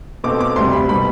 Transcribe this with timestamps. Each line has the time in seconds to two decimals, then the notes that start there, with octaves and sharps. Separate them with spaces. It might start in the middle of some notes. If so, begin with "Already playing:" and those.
0.24 B2 A3 C4 D6
0.41 D6
0.56 D2 C3 G3 C6
0.73 B5
0.89 B2 G3 C4 B5